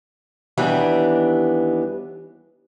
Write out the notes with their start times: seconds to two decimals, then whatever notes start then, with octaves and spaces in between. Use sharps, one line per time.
0.57 D#2 E3 G3 B3 D4